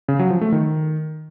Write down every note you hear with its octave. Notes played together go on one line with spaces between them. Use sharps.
C#3
F#3
F3
A3
D#3